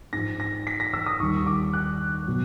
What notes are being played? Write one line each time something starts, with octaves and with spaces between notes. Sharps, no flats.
G#2 F3 A#6
A#6
B6
A#6
E6
D#6
D#2 D#3 G3 C#6
D6
F#6
B2 F#3